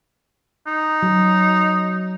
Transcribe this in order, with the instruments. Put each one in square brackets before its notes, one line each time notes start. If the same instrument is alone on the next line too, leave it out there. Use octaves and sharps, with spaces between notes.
[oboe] D#4
[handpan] F#3